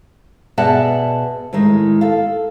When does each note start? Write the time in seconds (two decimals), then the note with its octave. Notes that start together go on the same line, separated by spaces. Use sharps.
0.58 B2 G#4 D5 E5 F#5 A5
1.53 A2 D#3 G#3
2.01 A4 F5